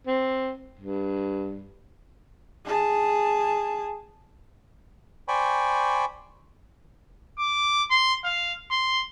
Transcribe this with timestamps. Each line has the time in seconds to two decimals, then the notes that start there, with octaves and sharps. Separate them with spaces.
0.07 C4
0.79 G2
2.65 G#4 A5
5.28 C5 D5 G5 G#5 B5 C#6
7.39 D6
7.90 C6
8.24 F5
8.71 C6